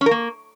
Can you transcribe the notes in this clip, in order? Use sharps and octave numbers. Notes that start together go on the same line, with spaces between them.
C#4
A#4
A#3